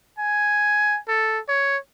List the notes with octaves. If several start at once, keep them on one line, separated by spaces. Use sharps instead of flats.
G#5
A4
C#5